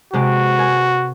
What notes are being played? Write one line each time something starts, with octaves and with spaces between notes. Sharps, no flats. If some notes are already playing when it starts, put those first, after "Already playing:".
C3 G#3 F#4 G4
A#4 G#5